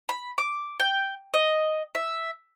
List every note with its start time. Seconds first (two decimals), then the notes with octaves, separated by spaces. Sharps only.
0.09 B5
0.38 D6
0.80 G5
1.34 D#5
1.95 E5